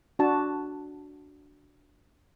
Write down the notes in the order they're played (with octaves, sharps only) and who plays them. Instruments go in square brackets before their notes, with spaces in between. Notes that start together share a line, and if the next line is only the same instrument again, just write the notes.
[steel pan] D4 F#4 A5